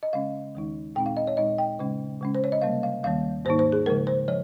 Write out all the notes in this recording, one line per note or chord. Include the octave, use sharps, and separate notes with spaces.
D#5
C#3 G#3 C#4 F5
D#2 D#3 G#3 D#4
A#2 G#3 C4 D#4 G5
F5
D#5
C#5
A#2 G#3 D#4 D#5
G5
C#3 G#3 C#4
C#3 G#3 C#4
C5
C#5
D#5
C3 G3 A#3 F5
F5
D#2 D#3 G3 A#3 F5
G#2 D#3 A#3 D#4 C5
C5
G#4
C#3 F3 G#3 A#4
C5
F3 C#5